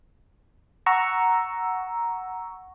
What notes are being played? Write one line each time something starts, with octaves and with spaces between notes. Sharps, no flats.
F#5 A#5 C#6 E6